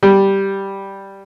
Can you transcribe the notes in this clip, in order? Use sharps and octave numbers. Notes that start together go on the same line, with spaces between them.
G3